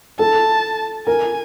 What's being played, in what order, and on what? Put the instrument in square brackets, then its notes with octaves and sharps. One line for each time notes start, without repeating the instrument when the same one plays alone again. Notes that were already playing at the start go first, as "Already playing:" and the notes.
[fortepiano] A4 [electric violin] A5
[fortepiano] A#4 [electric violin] G#5